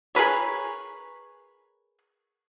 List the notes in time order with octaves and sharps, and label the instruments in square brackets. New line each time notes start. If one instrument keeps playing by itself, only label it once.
[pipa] G#4 A#4 B4 C#5